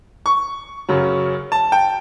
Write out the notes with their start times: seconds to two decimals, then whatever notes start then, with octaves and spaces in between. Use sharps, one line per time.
0.26 C#6
0.89 F#2 C#3 F#3 C#4
1.52 A5
1.72 G5